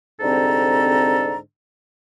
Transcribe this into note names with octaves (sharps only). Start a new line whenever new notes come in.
C2 G#2 D3 C4 A4 A#5